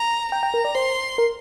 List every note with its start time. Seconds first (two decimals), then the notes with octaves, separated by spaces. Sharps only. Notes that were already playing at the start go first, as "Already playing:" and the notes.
Already playing: A#5
0.32 G5 A#5
0.43 G5
0.54 A#4
0.65 D5
0.75 C5 C6
1.18 A#4